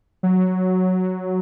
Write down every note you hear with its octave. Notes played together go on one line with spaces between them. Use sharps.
F#3